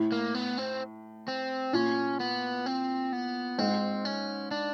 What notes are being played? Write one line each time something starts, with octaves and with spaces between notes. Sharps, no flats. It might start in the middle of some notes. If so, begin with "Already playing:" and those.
Already playing: A2
A#3
B3
C4
C4
A#2 C#4
B3
C4
B3
G#2 C4
C#4
D4